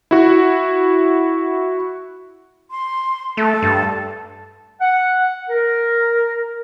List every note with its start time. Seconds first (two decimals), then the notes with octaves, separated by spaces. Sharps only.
0.11 E4 F#4
2.70 C6
3.37 A3 A4
3.62 G2
4.81 F#5
5.49 A#4